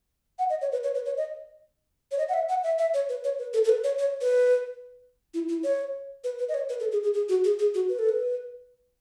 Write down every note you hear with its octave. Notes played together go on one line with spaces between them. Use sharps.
F#5
D#5
C#5
B4
C#5
B4
C#5
D#5
C#5
D#5
F#5
E5
F#5
E5
E5
C#5
B4
C#5
B4
A4
A4
B4
C#5
C#5
B4
E4
E4
C#5
B4
B4
D#5
C#5
B4
A4
G#4
G#4
G#4
F#4
G#4
G#4
F#4
B4
A4
B4